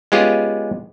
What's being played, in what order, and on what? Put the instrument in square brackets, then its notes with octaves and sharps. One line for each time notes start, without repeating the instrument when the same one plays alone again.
[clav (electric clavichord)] G#3 B3 C#4 F4 G4 G#4